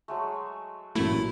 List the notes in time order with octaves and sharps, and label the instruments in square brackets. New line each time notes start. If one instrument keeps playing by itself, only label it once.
[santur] F#3 G#3 A3
[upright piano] A1 A#2 F#3 [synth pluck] A3 [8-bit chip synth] E4